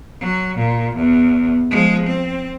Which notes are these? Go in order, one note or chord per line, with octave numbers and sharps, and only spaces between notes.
F#3
A#2
E2
F3 G#3
C4